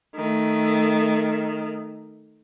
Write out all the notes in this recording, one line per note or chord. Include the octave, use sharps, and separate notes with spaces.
D#3 A3